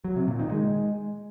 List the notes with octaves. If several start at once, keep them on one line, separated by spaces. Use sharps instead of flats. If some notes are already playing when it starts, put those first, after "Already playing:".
F#3
C3
A#2
D#3
G#3